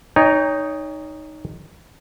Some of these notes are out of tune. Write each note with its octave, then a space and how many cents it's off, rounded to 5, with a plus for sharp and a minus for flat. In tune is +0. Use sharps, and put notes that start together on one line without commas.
D#4 +0 C#5 +25 G5 +45